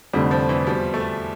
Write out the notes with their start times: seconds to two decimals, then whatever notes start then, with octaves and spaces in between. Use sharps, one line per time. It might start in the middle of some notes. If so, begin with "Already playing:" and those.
0.13 F1 F2 D3 G3 A3
0.31 F3
0.49 E3
0.67 E2 B2 F3 G3
0.94 A3